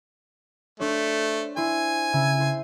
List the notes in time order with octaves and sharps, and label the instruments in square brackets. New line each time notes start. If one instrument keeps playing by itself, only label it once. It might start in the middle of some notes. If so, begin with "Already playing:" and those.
[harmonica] A3 [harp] D4 C5 C#5
[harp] E4 C5 [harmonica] G#5
[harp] C#3 E5
E4 C5